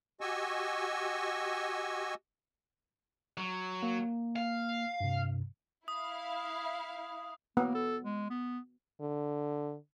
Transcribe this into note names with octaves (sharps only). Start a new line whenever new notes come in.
F#4 G4 D#5 G#5 C#6 E6
F#3
A#3
F5
G2 C3
E4 F5 D#6
A#3 B3
A4
G#3
B3
D3